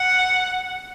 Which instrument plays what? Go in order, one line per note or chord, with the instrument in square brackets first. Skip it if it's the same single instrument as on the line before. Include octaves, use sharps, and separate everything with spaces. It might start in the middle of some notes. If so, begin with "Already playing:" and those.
Already playing: [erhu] F#5